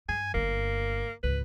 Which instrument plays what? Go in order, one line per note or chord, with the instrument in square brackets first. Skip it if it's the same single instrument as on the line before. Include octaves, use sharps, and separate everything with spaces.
[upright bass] G2 [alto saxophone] G#5
[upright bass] G1 G2 [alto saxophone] A#3
[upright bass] C#2 G#2 [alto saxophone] B4